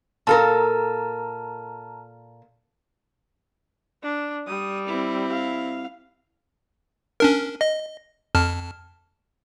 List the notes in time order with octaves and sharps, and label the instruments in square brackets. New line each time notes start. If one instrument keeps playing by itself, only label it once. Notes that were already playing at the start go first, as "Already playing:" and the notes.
[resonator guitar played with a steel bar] A#2 A4 A#4 [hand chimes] A5 A#5 F6
[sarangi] D4
[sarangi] G3 [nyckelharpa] D#6
[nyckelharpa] C4 E4
[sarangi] F5
[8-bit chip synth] C#4 D4 A#4
D#5
F2 A5 F6